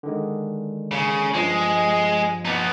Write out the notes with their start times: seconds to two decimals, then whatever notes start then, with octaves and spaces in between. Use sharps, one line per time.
0.03 D3 D#3 G#3
0.91 C#3
1.34 G2 F3 G#3
2.45 B3 D#4